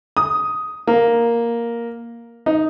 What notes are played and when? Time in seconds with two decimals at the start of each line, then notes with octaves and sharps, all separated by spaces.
0.17 D#6
0.87 A#3
2.46 D#4